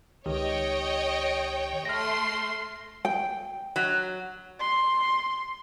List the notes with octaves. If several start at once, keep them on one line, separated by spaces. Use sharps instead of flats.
C#2 D#3 G4 C#5 D#5 G5
A3 C6 F6 A#6
G5
F#3
C6